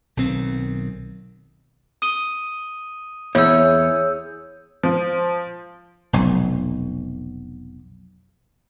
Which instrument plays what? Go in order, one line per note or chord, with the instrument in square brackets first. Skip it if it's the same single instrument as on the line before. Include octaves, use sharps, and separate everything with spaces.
[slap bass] B1 D#3 C4
[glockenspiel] D#6 D#7 G7
[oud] E2 [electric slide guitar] G#4 C#5 [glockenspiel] E6 G6
[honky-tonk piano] F3
[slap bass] F1 B1